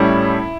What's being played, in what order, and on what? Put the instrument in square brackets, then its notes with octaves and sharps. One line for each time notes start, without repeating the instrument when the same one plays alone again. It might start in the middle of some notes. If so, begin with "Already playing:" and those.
Already playing: [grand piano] A2 G3 C#4 [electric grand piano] E4